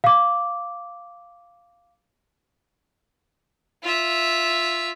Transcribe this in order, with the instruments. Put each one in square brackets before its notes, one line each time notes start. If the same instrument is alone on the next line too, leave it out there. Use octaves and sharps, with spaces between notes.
[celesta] F5 D6
[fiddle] F4 E5